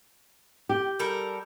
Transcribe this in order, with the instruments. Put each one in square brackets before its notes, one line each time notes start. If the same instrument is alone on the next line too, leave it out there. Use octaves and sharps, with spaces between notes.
[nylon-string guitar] G4
[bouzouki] G3 A4 A#4